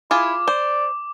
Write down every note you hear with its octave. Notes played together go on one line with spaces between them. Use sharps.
E4 F4 G#4 D6
C5 D5